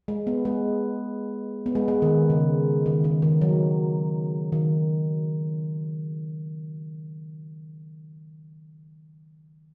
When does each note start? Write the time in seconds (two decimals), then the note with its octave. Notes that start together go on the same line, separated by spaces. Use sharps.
0.08 G#3
0.27 B3
0.45 G#3
1.66 B3
1.75 G#3
1.88 G#3
2.02 D#3
2.30 C#3
2.86 D#3
3.04 D#3
3.22 D#3
3.41 F#3
4.52 D#3